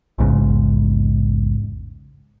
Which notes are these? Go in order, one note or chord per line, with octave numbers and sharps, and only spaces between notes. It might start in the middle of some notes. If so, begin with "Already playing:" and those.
A#1 E2 G#2 C#3